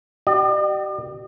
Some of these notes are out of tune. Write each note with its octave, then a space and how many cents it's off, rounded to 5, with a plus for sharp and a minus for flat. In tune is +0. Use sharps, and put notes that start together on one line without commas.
G4 -40 D5 +45